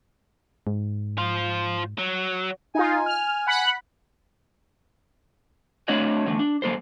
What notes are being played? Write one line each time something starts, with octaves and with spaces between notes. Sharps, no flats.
G#2
F4 C5
F#3
D#4 F4 G#5
F6
F#5 B5 F#6
A3 C4 D4 F#4 C#5 D#5
E2 D3 A3
D4
F#3 A#3 A4 C5